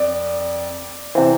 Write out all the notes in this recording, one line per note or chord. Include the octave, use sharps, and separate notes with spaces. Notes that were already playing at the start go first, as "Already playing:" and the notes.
Already playing: F2 D5
C3 E3 C5